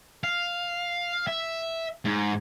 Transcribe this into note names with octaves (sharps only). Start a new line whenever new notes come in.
F5
E5
G#2